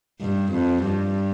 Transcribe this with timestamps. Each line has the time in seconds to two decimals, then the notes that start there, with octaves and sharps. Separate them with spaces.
0.21 G2
0.53 F2
0.85 G2